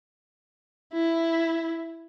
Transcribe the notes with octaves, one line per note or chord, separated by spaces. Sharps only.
E4